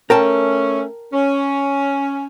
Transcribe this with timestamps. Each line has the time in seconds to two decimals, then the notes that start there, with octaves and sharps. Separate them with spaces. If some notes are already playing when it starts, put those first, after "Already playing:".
0.10 A3 C#4 A#4 G5 A5
1.13 C#4